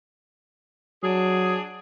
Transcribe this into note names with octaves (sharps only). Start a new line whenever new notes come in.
F#3 D4 G#4